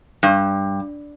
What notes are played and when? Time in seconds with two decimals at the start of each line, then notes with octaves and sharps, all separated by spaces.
0.23 G2